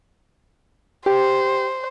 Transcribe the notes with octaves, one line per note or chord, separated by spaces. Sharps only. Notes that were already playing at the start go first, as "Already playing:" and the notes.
G4 C5